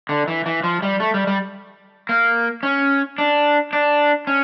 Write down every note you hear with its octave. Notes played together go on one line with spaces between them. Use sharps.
D3
E3
E3
F3
G3
A3
G3
G3
A#3
C#4
D4
D4
C#4